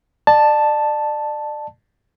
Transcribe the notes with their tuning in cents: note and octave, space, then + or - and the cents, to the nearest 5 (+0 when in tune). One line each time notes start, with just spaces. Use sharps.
D5 +35 A5 +0